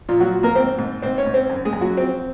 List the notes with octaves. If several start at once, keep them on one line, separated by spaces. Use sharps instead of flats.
A#2 F3 F4
F#3 F#4
F3
A#3 A#4
G#2 C4 C5
G#2
G#2 C4 C5
C#4 C#5
G#2
C4 C5
F#2
G#3 G#4
F#2
F#3 F#4
F3 C4